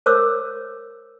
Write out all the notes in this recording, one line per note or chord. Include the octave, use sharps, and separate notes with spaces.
A#4 C5 C#5 D6 E6